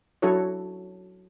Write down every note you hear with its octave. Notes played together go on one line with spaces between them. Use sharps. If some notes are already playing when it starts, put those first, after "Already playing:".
F#3 D4 E4 F#4 A4 C#5